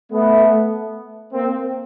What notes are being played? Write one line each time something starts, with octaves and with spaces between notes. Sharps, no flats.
A3 B3
A#3 C4